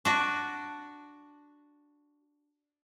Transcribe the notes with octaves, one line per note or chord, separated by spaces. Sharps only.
D4 F#4